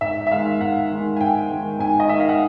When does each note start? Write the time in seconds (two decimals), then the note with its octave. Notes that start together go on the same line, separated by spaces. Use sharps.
0.01 G#2 E5
0.27 E5
0.32 D#3 G#3 F5
0.61 G#2 F#5
0.90 D#3 G#3
1.17 G#5
1.20 G#2 G5
1.50 D#3 G#3
1.79 G#2 G#5
2.00 D#5
2.09 D#3 G#3 E5
2.20 F5
2.29 F#5